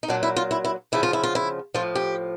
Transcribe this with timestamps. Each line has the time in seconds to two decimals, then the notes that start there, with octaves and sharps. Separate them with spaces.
0.03 D#4
0.08 A#2 F#3 D4
0.23 E4
0.36 F4
0.51 E4
0.65 E4
0.92 D2 C#3 F3 E4
1.03 F4
1.13 E4
1.23 F4
1.35 E4
1.74 A2 F3 F4
1.95 G4